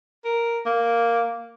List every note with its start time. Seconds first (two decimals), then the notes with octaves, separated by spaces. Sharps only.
0.25 A#4
0.66 A#3